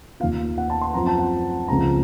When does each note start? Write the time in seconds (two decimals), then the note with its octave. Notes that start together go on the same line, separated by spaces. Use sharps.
0.20 D#2 D#3 A#3 F4 F5
0.58 F#5
0.70 A5
0.81 C6
0.94 F#2 F3 C4 F4 A#5
1.07 A5
1.19 F#5
1.68 C#2 C#3 F3 A3 C4 A#5